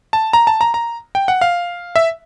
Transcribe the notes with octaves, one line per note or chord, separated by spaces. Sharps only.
A5
A#5
A5
A#5
A#5
G5
F#5
F5
E5